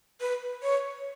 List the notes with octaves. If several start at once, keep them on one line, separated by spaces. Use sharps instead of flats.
B4
C#5